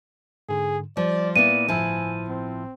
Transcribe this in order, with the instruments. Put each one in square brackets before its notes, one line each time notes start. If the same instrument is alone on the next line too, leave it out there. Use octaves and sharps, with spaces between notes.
[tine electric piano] G#2 D3 [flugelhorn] G#4
[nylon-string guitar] F3 [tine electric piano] G3 [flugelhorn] D5
[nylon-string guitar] A#2 B3 E4 [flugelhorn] D5 [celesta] D#7
[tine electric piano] G1 A2 E6 [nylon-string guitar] F3 E4 [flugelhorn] G#5
[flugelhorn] C4